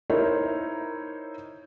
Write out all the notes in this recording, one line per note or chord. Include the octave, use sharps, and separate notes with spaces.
D#4 E4 A#4 C5 C#5